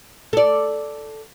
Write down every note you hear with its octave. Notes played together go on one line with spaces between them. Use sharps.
A4 D5